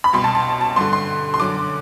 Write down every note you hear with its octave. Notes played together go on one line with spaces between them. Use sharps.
B5
C2 B2 C6
A5
A5
A5
G2 D3 C6
C6
C6
F#2 D3 D6